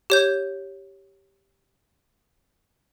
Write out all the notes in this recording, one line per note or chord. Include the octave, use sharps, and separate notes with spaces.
G4 C#5 G6